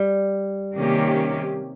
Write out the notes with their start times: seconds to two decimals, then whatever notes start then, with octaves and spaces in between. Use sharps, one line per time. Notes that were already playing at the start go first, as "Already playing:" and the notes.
Already playing: G3
0.76 C3 D#3 A#3 C#4 G4